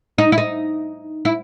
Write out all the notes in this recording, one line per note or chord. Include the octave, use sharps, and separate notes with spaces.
D#4
E4
D#4
E4